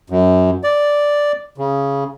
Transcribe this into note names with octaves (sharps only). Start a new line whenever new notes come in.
F#2
D5
C#3